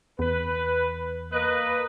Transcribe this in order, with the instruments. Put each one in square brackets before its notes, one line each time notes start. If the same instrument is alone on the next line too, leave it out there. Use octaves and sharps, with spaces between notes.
[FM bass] E2 [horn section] B4
[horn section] A#3 B4 D#5